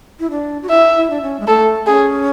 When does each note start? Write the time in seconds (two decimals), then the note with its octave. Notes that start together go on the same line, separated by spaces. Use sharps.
0.20 E4
0.30 D4
0.63 F#4
0.70 E4 E5
0.96 E4
1.10 D4
1.22 C#4
1.40 G#3
1.48 A3 A4
1.86 C#4 G#4